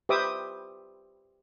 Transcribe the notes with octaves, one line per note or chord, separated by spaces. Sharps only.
G4 B4 C5 E5 D6 D#6